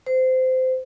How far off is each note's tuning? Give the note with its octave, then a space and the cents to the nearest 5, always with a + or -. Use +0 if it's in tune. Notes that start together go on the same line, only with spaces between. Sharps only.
C5 -20